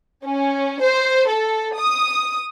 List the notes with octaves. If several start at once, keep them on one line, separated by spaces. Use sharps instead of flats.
C#4
C5
A4
D#6